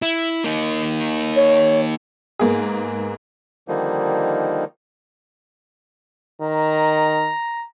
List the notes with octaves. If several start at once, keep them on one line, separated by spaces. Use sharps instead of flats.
E4
A#3 D#4
C#5
G#2 A#3 B3 G#4
D3 D#3 F3 G3 A#3 D#4
D#3 A#5